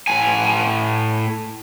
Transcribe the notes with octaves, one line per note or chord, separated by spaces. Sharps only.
A2 G#5